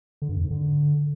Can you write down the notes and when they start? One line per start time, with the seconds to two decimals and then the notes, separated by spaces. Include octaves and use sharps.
0.22 D3
0.29 G2
0.36 F2
0.43 G#2
0.51 D3